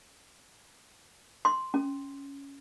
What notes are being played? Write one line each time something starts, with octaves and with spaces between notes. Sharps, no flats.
C6
C#4